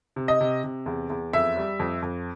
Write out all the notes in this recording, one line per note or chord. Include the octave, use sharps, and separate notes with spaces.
C3
D#5
C3
C3
E2
E2
F2 E5
G3
F2
F2